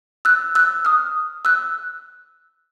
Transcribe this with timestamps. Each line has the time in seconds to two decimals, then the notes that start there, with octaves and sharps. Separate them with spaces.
0.25 E6 F#6
0.55 E6 F#6
0.85 D#6 F6
1.45 E6 F#6